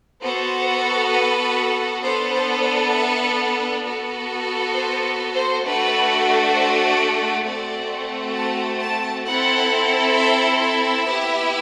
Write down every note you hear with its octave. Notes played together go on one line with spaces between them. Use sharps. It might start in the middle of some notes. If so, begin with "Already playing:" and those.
B3 F#4 A4 C5
B4
B3 D4 A4 C5
C5
C5
E5
B3 F#4 A4
C5
C5
A3 D4 F#4 B4
C5
D5
A3 C4 F#4 D5
A5
A5
C4 E4 A4 F#5
E5
E5
B3 E4 G4